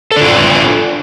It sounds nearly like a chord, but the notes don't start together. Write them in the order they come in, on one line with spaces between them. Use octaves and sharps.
A4 D4 F4 F#5